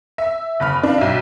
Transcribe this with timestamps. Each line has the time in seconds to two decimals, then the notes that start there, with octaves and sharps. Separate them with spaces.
0.18 E5
0.60 F#1 B5 F6
0.83 D4 F5
0.98 B1 E5